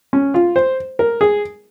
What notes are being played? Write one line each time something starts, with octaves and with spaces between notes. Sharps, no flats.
C#4
F4
C5
A#4
G#4